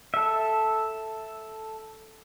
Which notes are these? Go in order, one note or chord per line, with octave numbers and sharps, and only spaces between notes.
A4 E5